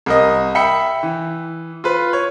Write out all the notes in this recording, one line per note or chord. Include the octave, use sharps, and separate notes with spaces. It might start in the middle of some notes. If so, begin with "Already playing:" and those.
C2 A#4 D#5
E5 G5 B5 E6 C#7
E3
F4 B4
C#5